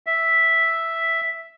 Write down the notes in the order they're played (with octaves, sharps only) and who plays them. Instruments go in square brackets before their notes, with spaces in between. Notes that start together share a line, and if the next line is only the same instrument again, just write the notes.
[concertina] E5